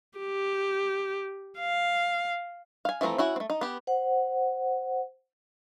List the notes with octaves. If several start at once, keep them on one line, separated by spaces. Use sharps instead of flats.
G4
F5
F5 G#5
E3 F3 A3 C4 A#5
C#4 E4 F#4
A3 C4
D#4
B3 G4
C5 F#5